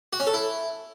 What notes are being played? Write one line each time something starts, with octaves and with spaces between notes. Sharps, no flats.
F#4
C#4
A4
E4